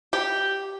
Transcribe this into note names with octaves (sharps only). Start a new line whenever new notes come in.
G4